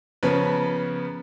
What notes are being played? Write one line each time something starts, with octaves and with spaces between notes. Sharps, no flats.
C#3 F3 B3 C#4 A#4 B4